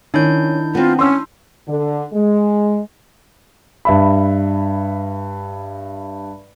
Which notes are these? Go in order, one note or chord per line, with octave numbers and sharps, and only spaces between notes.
D#3 C#4 D4 E4 G6
B3 C4 F4
C#4 C6 E6
D3
G#3
G2 E5 B5